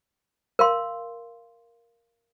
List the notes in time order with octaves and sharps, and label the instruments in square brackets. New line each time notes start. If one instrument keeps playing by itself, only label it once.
[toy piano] A#4 F5 C6